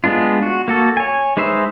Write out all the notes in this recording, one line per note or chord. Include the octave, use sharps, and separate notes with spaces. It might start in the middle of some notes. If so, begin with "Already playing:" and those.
G#3 B3 D4 F4
F#4
A#3 F#4 A4
C#5 G#5
G#3 D#4 B4 C5 E5